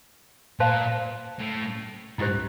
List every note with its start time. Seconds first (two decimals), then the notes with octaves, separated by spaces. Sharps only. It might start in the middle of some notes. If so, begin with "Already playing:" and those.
0.60 A#2 C5 F5 A5 C6
1.39 A2
2.18 G#2 E4 G4 C5